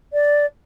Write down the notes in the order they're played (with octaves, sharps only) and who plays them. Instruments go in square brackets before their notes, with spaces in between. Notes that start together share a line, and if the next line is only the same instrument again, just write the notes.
[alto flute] D5